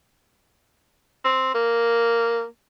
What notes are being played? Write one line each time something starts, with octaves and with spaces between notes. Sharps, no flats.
C4
A#3